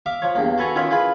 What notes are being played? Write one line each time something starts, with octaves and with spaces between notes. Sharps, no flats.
E5 F5 D6
F3 C#5
E2 G2 A#3
F#4 A4 B4 G#5 A#5 C#6
D#3 C#4 E4 F4 E5 F#5
E4 F4 G#4 B4 B5